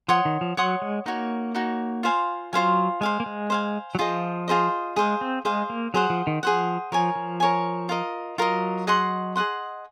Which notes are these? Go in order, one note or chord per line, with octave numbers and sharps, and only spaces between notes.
F3 C#5 F#5 C6 D#6
D#3
F3
F#3 C#5 F#5 C6 D#6
G#3
A#3 D#4 F#4 C#5
D#4 F#4 C#5
F4 C5 F5 G#5
F#3 F4 C5 F5 G#5
G#3 C5 F5 G#5
A#3
G#3
C5 F5 G#5
F#3
F3 F4 G#4 C5 D#5
F4 G#4 C5 D#5
G#3 G#4 C5 F5
C4
G#3 G#4 C5 F5
A#3
F#3 G#4 C5 F#5
F3
D#3
F3 G#4 C5 F#5
F3 A#4 C#5 G#5
F3
A#4 C#5 G#5
F4 A#4 D#5
F#3 F4 A#4 D#5
G#4 D#5 F#5 C6
G#4 D#5 F#5 C6